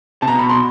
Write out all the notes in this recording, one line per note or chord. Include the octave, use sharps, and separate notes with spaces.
C3 A5
B2 A#5
B5
C6